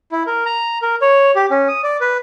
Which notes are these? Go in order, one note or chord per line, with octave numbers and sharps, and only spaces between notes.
E4
A#4
A#5
A#4
C#5
G4
C#4
D#6
D5
B4